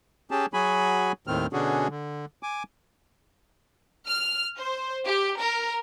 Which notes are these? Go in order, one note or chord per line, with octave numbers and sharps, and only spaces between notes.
C#4 G4 G#4 A5
F#3 F#4 G#4 G#5 B5
D#2 A2 D#3 C4 F6
B2 D3 C#4 D4 F#4 G#4
D3
G#5 D6
F6
C5
G4
A#4